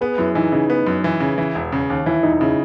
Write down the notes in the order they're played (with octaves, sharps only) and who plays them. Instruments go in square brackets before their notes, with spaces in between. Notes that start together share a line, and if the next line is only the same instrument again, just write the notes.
[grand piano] B3 [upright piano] G#4 B4
[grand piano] F#2 [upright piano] E4
[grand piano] E3 [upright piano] D#4
[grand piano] C#3 [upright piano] D#4
[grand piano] B3
F#2
E3
C#3
E3
E1
C#3
D#2
[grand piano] E3 [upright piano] E4
[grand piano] E1 [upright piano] D#4
[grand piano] C#3 [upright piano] E4